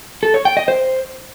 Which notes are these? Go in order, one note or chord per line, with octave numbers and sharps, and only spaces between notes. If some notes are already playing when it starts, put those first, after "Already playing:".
A4
C#5
G5
D#5
C5